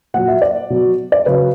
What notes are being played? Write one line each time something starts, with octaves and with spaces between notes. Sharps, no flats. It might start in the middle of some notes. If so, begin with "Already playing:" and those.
A#2 F#3 F#5
E5
D5
B2 F#3
D5
C#3 F#3 B4